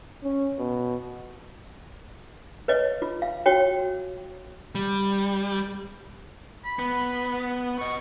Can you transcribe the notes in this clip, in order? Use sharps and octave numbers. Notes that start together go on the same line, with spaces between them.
C#4
B2
B4 C#5 D#5
F4
F5
F#4 C#5 G5
G3
B5
B3
B4 D#5 C#6